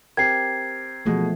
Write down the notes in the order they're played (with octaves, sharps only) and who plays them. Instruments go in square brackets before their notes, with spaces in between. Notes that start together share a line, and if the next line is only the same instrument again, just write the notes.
[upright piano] C4 G4 A#4 [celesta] G#6 C7
[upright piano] B2 G#3 [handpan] E3 F3 A3